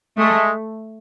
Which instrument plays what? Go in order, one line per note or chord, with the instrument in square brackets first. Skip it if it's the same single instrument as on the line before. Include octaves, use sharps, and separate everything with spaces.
[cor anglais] G#3 [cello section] A3